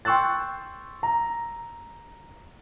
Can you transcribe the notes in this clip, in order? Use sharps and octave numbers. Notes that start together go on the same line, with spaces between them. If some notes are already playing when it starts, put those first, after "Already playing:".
G5 C6 C#6 E6 F#6 A6
A#5